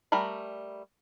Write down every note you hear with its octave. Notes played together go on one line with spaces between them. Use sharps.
G3 A3 A#4 B5